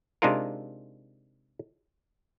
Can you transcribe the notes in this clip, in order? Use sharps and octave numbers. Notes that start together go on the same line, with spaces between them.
C3 G#3 D4 D#4 F4 A#4